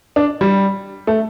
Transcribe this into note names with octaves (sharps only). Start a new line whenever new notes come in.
D4
G3
A3